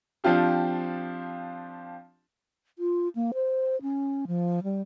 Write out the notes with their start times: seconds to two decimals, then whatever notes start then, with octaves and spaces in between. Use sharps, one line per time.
0.24 F3 C4 D4 F4 G4
2.79 F4
3.15 A#3
3.34 C5
3.82 C#4
4.27 F3
4.63 G3